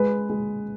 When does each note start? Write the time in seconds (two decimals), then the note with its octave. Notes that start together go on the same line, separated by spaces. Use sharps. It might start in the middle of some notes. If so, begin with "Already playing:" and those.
Already playing: G#3 B4
0.29 G#3